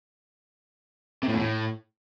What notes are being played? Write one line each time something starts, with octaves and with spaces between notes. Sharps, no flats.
C3
A2
E2
A2